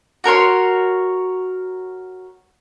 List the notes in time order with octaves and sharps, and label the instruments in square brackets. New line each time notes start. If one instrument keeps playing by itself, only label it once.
[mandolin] F#4 A#4 C#5 C6